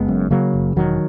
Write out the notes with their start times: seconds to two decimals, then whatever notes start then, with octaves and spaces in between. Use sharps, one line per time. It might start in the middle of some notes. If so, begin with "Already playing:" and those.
Already playing: F#1 G#3 B3
0.08 F#2
0.31 C#3 F#3 A#3
0.54 F#1
0.76 E1 D#3 F#3